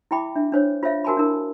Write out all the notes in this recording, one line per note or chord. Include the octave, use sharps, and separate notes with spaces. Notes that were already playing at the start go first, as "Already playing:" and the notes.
E4 E5 G5 B5 D6
D4 E5
D4 C5 C#5
F4 C5 C#5 E5 F5
F#4 A#4 G#5 A5 B5
D4 E4 A#4